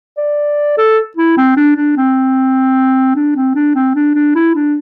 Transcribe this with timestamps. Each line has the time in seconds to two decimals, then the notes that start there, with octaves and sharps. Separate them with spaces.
0.18 D5
0.78 A4
1.17 E4
1.37 C4
1.57 D4
1.76 D4
1.97 C4
3.16 D4
3.36 C4
3.55 D4
3.75 C4
3.95 D4
4.15 D4
4.35 E4
4.55 D4